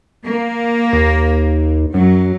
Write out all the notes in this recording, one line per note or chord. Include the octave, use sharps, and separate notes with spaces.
A#3
D#2
F#2 F#3